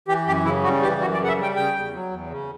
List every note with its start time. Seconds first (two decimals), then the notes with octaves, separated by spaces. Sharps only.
0.08 E3 G4
0.26 F#2 G4
0.45 C#3 E4
0.63 G3 F#4
0.82 E3 G4
1.01 F#2 F#4
1.14 D5
1.20 C#3 F#5
1.28 E5
1.37 G3
1.43 G5
1.56 C#3 G5
1.75 E2
1.93 F#3
2.11 E2
2.30 C#3